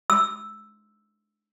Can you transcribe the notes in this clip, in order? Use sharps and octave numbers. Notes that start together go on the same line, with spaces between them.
E6